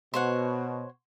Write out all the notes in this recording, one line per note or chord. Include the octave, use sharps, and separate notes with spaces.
B2 C5 C#5 F#5